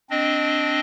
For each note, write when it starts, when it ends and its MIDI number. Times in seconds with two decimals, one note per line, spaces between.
0.10 0.80 60
0.10 0.80 62
0.10 0.80 75